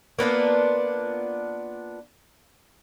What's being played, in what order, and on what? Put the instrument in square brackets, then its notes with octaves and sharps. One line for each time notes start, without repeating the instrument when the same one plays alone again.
[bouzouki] A#3 B3 D4 F4